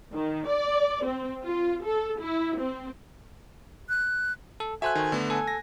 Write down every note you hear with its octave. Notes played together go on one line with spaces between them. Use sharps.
D#3
D5
C4
F4
A4
E4
C4
F#6
A4
F#4 A4 C5 E5 G#5 F#6
D#3
D3 A3 B3
A4 G#5
A#6